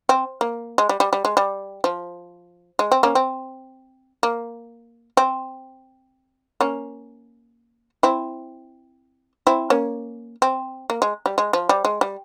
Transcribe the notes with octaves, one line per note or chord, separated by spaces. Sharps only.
C4
A#3
G#3
G3
G3
G3
G#3
G3
F3
G#3
C4
A#3 C#4
C4
A#3
C4
A#3 C#4
C4 E4
C4 E4
A#3 C#4
C4
A#3
G#3
G3
G#3
F3
G3
G#3
G3